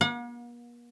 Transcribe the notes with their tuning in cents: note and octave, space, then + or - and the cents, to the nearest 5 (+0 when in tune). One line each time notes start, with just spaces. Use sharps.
A#3 +45 F#5 -40